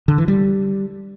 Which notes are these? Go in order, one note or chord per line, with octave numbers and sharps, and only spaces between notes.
D3
E3
G3